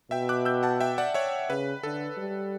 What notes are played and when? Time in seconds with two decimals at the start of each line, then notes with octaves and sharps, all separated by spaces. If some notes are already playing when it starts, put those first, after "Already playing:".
0.11 B2 E5 G5
0.29 D6 F#6
0.45 E6 G6
0.63 F#5 A5
0.80 E5 G5
0.98 D5 F#5
1.14 C#5 E5
1.49 C#3 B4
1.83 D3 A4
2.18 G3